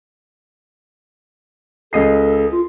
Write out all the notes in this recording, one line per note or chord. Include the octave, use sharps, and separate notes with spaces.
C#2 A4 D#5 C7
F4